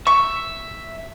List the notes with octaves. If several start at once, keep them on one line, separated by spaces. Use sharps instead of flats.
E5 C#6